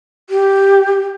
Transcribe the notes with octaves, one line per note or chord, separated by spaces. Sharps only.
G4